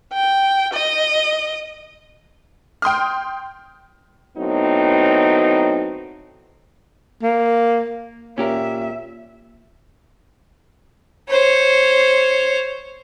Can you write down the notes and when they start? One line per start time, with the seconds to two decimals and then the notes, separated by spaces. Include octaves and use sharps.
0.13 G5
0.73 D#5
2.82 G5 C6 D#6 F6
4.37 A2 F#3 B3 C4 D#4
7.23 A#3
8.38 A#2 C#4 G4 A#4 E5
11.29 C5 C#5